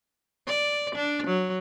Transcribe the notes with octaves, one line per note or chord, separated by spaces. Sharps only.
D5
D4
F#3